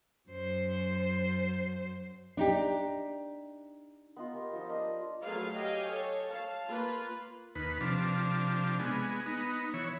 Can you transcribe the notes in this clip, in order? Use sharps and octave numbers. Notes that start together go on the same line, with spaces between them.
F#2 C5
D4 D#4 G4
B3 D#4 F4
G4 A#4
F3 D#4
D4 A#4 D#5
F#3 A3 G#4 A4 B4 F5
G4 D#5 F5 G5 G#5
A4 C#5
F5 A5
A#3 F4 B4
D#2 B4
C3 F3 D4
G#3 B3
B3 D#4
E3 C#5